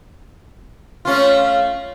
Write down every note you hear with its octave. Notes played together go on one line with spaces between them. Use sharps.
A3 C#4 F4